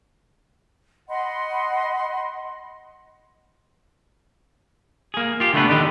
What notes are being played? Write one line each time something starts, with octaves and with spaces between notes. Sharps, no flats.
D#5 F#5 B5 C6
A#3 G#4
F4 G4
D3 G3 A3 B3 D4 B4
D3 D#3 G4 D#5